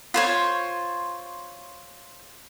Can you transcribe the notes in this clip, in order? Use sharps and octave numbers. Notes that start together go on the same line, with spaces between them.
F4 C5 C#5